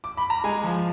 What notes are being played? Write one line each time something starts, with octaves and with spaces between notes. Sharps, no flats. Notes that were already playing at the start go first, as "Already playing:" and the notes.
D6
B5
A#5
G#3 G#5
F3